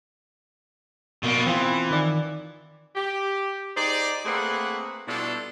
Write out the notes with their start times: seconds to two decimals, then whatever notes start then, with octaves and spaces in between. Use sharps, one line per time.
1.23 B2 A#3
1.46 E3 C4 F4
1.91 D#3 D5
2.96 G4
3.76 D#4 G4 G#4 C5 D5
4.26 A3 A#3 C4 G#4 B4 F#5
5.08 B2 G3 D4 E4 F4 A4